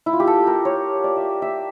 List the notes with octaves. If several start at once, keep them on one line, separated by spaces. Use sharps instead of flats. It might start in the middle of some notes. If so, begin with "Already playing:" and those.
E4
F4
G4
A4
A#4
C#5
D5
E5
E5